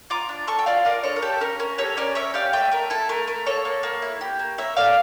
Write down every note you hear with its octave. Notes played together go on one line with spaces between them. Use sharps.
F4 A#5 D6
D4
A4 A5 C#6
G5
F4 D5 F5
F4 A#4 D5
D4 A4 C#5
A#4
G4 A4
C#4 A#4
C#4 A#4
G4 A4 C#5
C#4 A#4 D5
C#4 C#5 E5
G4 D5 F5
A3 E5 G5
A3 A#4
E4 A4
A3 A#4
A3 A#4
A#3 A4 C#5
A#3
A#3
E4
G4
A#3
A#3 C#5 E5
A4 D5 F5